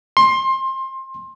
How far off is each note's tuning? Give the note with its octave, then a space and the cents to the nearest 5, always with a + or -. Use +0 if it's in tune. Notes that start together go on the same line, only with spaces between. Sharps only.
C6 +25